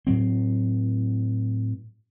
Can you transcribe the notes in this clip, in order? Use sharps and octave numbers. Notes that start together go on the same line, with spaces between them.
A2 F#3 C4